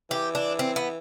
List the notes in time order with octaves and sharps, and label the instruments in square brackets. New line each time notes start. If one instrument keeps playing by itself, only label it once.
[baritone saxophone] E3 [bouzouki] G4
[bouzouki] D4
C4
B3